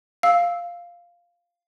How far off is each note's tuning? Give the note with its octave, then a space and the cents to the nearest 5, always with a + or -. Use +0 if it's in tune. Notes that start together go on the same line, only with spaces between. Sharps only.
F5 +0 E6 -10